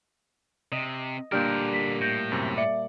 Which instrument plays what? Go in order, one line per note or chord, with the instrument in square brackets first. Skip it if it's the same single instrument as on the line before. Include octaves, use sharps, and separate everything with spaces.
[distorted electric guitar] C3 [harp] D#5
[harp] A#2 G3 [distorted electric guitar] D3 A#4 [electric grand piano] D4 G4 [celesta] F6 G6
[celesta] B6
[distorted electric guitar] A2 [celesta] G6 A#6
[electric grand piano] F#2 C3
[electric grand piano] D5 C#7 [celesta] E5